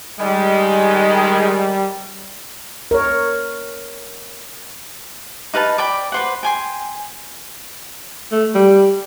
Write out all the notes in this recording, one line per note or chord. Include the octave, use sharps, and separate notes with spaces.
D#3 G3 G#3
A#4 C#5
D#4 B4 F5 A5
D5 G5 B5
B4 C5 F#5
G5 G#5 C6
A3
G3